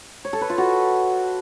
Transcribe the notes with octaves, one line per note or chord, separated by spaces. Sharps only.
C#5
A4
B4
F4
F#4